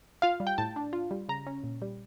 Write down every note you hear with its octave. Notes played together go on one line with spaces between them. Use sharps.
F4 F5
G3
G5
A2 A5
D4
F4
G3
C#3 A#5
C#4
A#2
G3